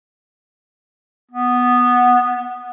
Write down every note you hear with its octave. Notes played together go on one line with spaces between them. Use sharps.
B3